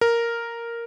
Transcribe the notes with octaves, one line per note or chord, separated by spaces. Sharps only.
A#4